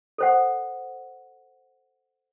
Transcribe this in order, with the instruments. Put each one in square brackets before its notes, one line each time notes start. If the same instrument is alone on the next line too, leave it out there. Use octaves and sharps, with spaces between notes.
[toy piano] A4 C5 F#5